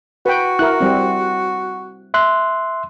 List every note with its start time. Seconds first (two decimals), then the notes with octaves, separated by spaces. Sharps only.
0.26 F#4 B4 G5
0.59 E4 A#4 F#6
0.80 G3 C4
2.14 E5 C6 F#6